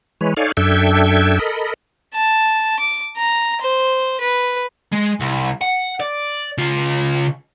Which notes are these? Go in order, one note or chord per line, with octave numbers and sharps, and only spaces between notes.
E3 G#3 B4 C#5
D#4 A4 C#5 D5 F5 G#5
F#2 D4 A4 E5 G5 G#6
A4 A#4 D#5 B5
A5
D6
A#5
C5
B4
G#3
C2
F#5
D5
C#3 F4